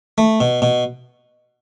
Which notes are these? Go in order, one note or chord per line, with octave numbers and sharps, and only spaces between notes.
A3
B2
B2